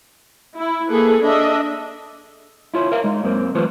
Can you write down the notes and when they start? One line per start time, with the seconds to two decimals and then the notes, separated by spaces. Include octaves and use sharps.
0.55 E4
0.90 A#3 G#4 A4 B4
1.23 D4 D#5 E5
2.74 E4 F4 C#5
2.92 A#4 E5 F5
3.04 G#3 D#4
3.23 F#2 A#3 C4
3.54 E3 F#3 A3 F4 B4 C5